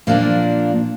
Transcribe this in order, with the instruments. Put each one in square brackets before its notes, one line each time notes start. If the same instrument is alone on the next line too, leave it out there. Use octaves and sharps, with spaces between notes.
[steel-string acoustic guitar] A#2 F3 A#3 D4